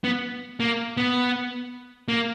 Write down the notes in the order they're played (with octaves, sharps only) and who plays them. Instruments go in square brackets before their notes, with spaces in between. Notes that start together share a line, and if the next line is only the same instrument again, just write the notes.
[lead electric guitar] B3
A#3
B3
A#3